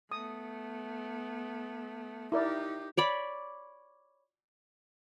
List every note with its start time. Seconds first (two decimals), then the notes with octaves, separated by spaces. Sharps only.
0.12 A3 B3 D#6
2.32 D#4 E4 G4 A#4 D5
2.97 C#5 D5 B5